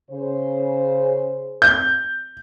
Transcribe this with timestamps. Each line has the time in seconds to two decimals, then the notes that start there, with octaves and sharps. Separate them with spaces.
0.11 C#3 C5
1.62 G6